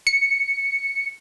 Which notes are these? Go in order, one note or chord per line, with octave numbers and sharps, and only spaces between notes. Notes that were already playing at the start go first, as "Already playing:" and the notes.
C#7